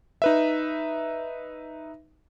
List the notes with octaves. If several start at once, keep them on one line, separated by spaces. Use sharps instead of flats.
D#4 B4 E5